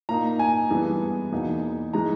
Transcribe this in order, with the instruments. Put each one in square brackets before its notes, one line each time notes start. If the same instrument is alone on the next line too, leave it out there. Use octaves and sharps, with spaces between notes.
[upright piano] A#2 A#3 D#4 A#5
G#5
G2 E3 G#3 B3
E2 B2 A#3 D#4
E3 G#3 D#4 A#5